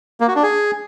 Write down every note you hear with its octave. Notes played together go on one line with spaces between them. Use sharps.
A#3
F#4
D4
G#4